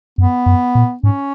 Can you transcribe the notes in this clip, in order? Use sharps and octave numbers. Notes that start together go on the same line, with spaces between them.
F#2 B3
F#2
A#2
G#2 C#4